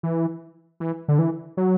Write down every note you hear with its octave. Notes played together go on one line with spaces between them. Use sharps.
E3
E3
D3
E3
F#3